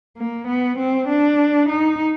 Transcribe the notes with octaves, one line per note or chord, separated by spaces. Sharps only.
A#3
B3
C4
D4
D#4